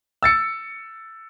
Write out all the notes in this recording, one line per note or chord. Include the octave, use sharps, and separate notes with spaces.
E6 A6 C#7